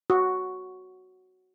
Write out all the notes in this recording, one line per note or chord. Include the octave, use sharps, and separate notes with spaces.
F#4